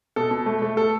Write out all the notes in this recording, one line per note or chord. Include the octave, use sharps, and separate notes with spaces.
B2 A4
B2
A3
A3
A4